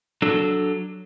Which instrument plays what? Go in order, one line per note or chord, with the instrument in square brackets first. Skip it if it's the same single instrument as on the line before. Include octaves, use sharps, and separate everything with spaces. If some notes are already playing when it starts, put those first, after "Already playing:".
[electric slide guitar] F#3 D4 A4